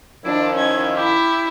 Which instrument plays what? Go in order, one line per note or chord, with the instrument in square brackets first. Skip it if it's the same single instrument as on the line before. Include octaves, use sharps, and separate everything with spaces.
[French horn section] D#3 F3 [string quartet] D4 [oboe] E4
[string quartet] C#4 G#6
[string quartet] E4 E5 [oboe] G4